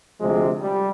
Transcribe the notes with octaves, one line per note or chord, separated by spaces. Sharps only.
D2 C3 F3 G#3
G3